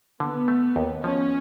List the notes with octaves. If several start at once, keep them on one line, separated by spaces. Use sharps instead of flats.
D3 B3
A3
D#2
F3 C#4